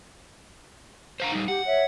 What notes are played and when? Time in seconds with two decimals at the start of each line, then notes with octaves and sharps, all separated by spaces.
1.20 C5 F5 A#5
1.32 G3 D#4
1.48 G4 F#5
1.66 C#5 E5